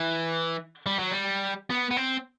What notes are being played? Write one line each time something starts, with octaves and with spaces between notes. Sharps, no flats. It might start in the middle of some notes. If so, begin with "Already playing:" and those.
Already playing: E3
G3
F#3
G3
B3
B3
C4